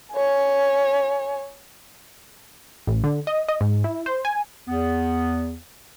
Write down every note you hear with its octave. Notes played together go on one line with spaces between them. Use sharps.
C#5 G#5
A1
D3
D#5
D#5
G#2
E4
C5
G#5
E2 B3